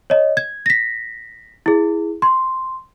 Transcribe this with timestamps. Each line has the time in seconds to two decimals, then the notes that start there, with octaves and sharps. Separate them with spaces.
0.10 C#5 D#5
0.37 G#6
0.66 A#6 B6
1.66 E4 G#4
2.22 C6